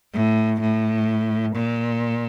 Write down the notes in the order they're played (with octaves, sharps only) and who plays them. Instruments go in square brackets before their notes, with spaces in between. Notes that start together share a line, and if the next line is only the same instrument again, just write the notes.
[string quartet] A2
A2
A#2